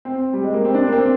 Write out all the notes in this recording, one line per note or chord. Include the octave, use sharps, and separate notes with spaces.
C4
G3
G#3
A#3
C4
D4
A#3
C4